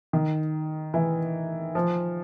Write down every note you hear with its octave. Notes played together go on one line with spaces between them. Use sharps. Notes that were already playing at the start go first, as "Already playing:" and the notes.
D#3
E3
F3